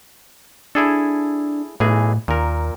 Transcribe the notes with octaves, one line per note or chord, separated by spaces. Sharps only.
D4 E4 G#4 A4
B1 A2 E3 G#4
D#2 A#2 A#4